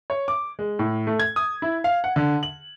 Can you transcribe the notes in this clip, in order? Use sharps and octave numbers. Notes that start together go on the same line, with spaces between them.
C#5
D6
G#3
A2
A3
G#6
D#6
E4
F5
F#5
D3
F#7